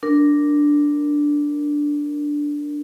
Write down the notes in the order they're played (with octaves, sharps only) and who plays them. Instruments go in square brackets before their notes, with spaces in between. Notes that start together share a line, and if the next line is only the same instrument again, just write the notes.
[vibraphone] D4 A#4